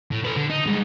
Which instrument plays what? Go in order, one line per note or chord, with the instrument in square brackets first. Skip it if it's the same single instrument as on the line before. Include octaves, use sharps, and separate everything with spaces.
[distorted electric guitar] A2
A4 B4
D3
D#4
G2 G#3